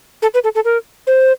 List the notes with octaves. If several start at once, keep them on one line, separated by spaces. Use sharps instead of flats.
A4
B4
A4
A4
A#4
C5